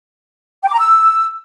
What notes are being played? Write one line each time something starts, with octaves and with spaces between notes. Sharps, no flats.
G5
D6
A#5
E6